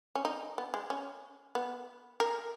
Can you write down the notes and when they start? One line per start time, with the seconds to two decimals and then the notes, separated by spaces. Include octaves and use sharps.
0.15 C#4
0.25 D#4
0.58 B3
0.74 G#3
0.90 C#4
1.55 B3
2.20 A#4